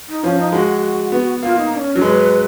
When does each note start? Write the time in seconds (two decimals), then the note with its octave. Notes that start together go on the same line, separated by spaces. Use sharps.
0.09 D#4
0.23 F3 C#4
0.38 D#4
0.52 G#3 F#4
1.12 B3
1.42 A#3 F4
1.56 D#4
1.72 D#4
1.76 C#4
1.95 F#3
2.01 G#3 B4